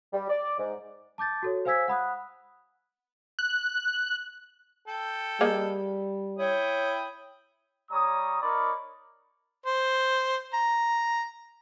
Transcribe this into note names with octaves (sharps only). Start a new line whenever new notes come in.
G3
D5
G#2
A5 D6 G6 A6
F#4 A4 C#5
C5 F5 G#5 E6 G#6 B6
F#5 B5 D#6 F#6
F#6
A4 G5
G3 A#3 G#4 D#5
E4 C#5 G5 D#6
G3 C#5 A#5 D#6
D#4 A#4 C#5 D5 B5
C5
A#5